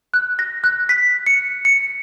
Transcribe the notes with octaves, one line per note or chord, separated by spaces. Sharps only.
F#6
A#6
F#6
B6
C#7
C#7